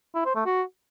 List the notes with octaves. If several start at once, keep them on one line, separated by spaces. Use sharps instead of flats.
E4
C5
A3
F#4